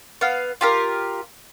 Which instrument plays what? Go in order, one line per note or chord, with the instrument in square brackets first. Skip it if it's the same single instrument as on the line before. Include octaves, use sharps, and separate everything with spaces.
[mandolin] B3 F5
F4 G4 A#4